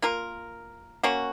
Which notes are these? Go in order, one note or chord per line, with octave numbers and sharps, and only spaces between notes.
A#3 F4 A#4
A#3 C#4 F#4